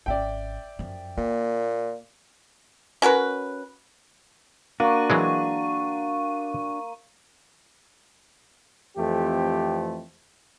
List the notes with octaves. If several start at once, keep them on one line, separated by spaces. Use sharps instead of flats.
G#1 C#4 D5 E5 G5
F#2 F3
A#2 A#3
C#4 F#4 A#4 B4
A#3 D4 F#4 C#6 D#7
E3 F#3 G#3
F2 E3 A3 C4 G4